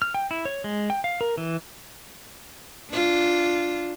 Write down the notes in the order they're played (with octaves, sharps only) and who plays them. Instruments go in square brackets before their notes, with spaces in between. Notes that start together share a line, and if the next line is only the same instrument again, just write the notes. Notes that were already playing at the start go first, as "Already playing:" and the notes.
[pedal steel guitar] F6
G5
E4
C#5
G#3
G5
F5
A#4
E3
[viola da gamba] D4 F4